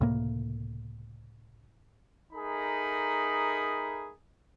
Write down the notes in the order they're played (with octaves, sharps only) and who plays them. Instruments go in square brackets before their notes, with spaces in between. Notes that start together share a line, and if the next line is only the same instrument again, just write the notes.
[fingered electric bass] C#2 A2 C3 A#3
[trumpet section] A3 D#4 G#4 A#4 B5